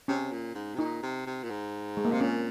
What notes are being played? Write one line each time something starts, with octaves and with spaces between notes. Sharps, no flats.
C3 C#4
A#2
G#2
C3
A#2 D#4
C3
C3
A#2
G#2
G#3
A#3
C3 C4
A#2 C#4